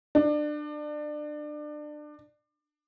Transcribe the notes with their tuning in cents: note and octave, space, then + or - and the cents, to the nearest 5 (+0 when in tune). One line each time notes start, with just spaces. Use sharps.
D4 +25